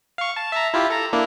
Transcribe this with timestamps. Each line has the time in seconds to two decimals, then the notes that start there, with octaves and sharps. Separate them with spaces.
0.18 F5 C#6
0.36 A5
0.52 E5 A5 A#5
0.74 E4 F4 G4
0.90 A4 A#5
1.13 A#3 D4 E4